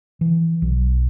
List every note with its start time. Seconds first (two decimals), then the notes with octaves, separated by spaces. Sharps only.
0.21 E3
0.62 B1